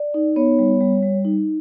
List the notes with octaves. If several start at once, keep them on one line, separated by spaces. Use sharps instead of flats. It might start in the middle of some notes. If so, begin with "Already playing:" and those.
Already playing: D5
D#4
B3 C#5
G3
G3
G3
D#4